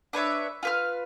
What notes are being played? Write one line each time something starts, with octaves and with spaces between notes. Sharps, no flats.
D4 B4 C#5 E5
F4 B4 F6